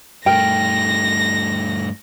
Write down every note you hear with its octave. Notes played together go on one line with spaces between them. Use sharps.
G2 A3 A#4 G5 A#6